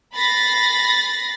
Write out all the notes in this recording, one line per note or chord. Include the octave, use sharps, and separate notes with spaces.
B5 A6 A#6 C7